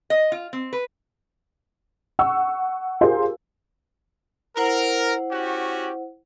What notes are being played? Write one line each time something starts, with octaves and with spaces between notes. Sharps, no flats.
D#5
F4
C4
B4
F#5 C#6 E6
F4 G4 G#4 A#4 C5
E4 A#4 C5 F#5
C#4 F#4 G4